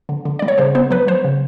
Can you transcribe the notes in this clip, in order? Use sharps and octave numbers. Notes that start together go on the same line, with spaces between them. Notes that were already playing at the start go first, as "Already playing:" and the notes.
D3
D3
G3 D5
C#5
C#3 C5
B3 C5
F#3 B4
F#3 C5
C#3